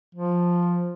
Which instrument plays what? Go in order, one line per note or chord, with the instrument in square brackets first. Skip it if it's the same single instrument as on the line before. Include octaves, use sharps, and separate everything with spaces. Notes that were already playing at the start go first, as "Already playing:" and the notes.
[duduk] F3